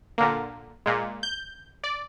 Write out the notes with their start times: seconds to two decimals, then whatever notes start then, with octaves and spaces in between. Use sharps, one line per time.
0.18 A#2 D3 A#3
0.86 A#2 G#3
1.23 G6
1.84 D5